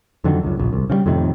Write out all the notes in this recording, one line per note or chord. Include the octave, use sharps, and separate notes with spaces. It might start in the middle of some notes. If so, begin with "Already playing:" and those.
F2 D3 D#3 F#3
C#2 F#2
D1 A#1
C2
C#3 E3 G3
F2 A2 C3 D#3